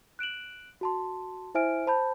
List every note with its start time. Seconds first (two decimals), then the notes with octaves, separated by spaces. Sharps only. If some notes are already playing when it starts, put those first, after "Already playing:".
0.19 F#6 D7 E7 F#7
0.81 F#4 A5 C6
1.55 E4 C5 E5 G#5 F6 D7
1.87 C5 A5 B5 G6